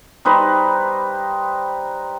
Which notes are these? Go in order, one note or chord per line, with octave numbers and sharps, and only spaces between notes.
G3 D#4 B4 C5